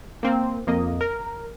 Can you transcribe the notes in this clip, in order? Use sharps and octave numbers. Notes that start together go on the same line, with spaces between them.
A#3 C4
F2 A#3 D#5
A#4